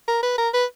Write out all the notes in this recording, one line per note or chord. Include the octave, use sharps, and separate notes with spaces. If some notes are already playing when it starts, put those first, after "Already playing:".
A#4
B4
A#4
B4